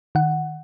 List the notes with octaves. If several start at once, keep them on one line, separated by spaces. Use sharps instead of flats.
D#3 F#5